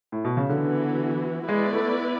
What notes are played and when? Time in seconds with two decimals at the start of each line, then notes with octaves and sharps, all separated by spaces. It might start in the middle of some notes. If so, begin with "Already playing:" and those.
0.12 A2
0.24 B2
0.37 C#3
0.49 D3 E3 B3 F#4
1.47 G#3 B3 E4 B4 D5
1.73 A3